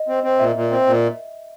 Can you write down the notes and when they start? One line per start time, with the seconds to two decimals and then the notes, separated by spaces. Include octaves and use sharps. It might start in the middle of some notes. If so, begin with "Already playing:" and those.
Already playing: D#5
0.08 C4
0.24 C4
0.39 A#2 E5
0.56 A#2
0.71 C4
0.87 A#2